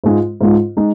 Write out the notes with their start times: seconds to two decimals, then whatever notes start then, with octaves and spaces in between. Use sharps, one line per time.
0.04 G#2 G#3 F4
0.41 G#2 G#3 F4
0.77 G#3 D#4